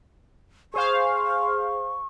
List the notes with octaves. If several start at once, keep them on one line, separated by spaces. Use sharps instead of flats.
G#4 C5 F5 C#6